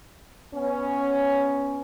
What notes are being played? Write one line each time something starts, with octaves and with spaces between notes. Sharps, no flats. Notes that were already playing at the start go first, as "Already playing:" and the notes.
B3 C#4